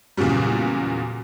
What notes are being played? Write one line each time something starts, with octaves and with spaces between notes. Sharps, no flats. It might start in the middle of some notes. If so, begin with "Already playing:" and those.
E2 A#2 C#3 F#3 G3